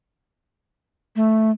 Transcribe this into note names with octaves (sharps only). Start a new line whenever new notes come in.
A3